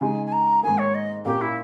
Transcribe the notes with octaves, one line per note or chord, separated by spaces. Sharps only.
C#3 G#3 D#4 G#5
G#5
A#5
G#2 D#3 A#3 G#5
C#5
D#5
A#2 A#3 C#4 G4
E4